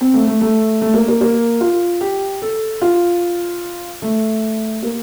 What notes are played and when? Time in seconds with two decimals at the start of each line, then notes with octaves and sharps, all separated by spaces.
0.01 C4
0.13 A3
0.27 A3
0.41 A3
0.81 A3
0.94 A#3
1.08 A#3
1.21 A#3
1.61 F4
2.01 G4
2.42 A4
2.82 F4
4.02 A3
4.83 A#3